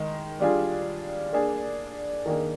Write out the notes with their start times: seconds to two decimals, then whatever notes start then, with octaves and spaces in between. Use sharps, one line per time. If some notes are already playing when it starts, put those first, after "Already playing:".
Already playing: D#3 G#3
0.40 G3 D4 F4 G#4
1.33 A#3 D4 G#4
2.26 D#3 A#3 D4 G#4